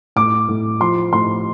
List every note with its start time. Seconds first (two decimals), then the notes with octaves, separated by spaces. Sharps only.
0.16 A2 D6
0.49 A2
0.80 F3 C6
1.13 A2 C6